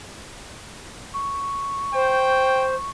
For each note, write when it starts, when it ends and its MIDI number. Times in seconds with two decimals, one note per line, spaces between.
1.14 2.90 85
1.94 2.75 72
1.94 2.67 79